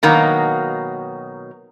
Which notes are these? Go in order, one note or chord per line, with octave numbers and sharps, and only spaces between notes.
B2 D#3 F#3 A#3